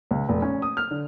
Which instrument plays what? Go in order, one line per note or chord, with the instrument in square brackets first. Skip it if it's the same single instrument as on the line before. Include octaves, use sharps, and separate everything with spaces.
[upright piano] C#2
F1
C#4
D#6
F6
D3